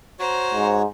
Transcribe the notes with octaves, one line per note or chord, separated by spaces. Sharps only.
F#4 C5 C#5 A#5
G#2